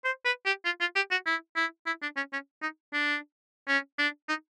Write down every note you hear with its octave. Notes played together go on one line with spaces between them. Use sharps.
C5
B4
G4
F4
F4
G4
F#4
E4
E4
E4
D4
C#4
C#4
D#4
D4
C#4
D4
D#4